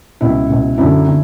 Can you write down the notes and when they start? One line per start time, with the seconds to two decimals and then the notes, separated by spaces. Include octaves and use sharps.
0.21 C#2 B2 E4
0.49 C#2 B2
0.78 F#2 D3 E4
1.07 D3